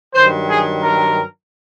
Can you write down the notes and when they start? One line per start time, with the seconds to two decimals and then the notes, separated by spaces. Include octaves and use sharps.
0.14 G2 D#3 F#3 C5
0.48 G#4
0.82 A#4